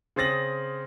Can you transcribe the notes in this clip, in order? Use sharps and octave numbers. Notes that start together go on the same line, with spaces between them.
C#3 C4 D#6 A6 A#6 F#7